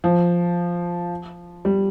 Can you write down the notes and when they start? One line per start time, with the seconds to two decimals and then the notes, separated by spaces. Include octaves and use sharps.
0.04 F3
1.65 G3